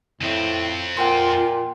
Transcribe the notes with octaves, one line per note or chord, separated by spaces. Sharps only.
F2 A2 C4
A#2 F4 F#5 G5 C6